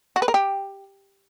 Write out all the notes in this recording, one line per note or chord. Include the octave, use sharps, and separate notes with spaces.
F#4
B4
A#4
G4